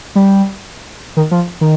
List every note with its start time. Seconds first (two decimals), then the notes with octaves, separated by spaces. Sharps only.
0.15 G3
1.17 D#3
1.31 F3
1.61 D#3